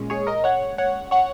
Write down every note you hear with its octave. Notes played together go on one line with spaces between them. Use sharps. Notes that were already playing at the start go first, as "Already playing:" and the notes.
Already playing: A#2 G#3 C#4
G#4 C#5
A#4 D#5
C#5 F#5
C#5 F#5
C#5 F#5